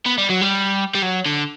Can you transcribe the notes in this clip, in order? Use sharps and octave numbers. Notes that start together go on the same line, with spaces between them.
B3
G3
F#3
G3
G3
F#3
D3